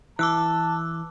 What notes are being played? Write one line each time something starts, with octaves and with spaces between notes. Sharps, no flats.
E3 A5 D6 E6 F#6